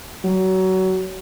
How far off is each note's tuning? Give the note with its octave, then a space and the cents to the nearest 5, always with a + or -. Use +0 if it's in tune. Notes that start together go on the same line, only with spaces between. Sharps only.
F#3 +25